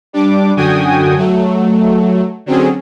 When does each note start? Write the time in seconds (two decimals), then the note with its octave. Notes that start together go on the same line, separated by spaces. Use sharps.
0.13 G3 D4 D6
0.56 F#2 D3 F#4 G5 G#5 D#6
1.17 F#3 A3
2.46 D3 F#3 C4 C#4 G#4